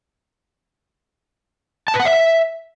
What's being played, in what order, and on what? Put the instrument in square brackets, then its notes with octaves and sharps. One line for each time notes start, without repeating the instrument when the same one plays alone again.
[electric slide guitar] A5
B4
F#5
E5